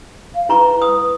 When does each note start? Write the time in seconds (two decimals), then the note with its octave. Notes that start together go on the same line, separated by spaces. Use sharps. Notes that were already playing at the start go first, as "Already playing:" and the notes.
0.35 F5
0.49 E4 B4 A#5 C#6
0.82 D#6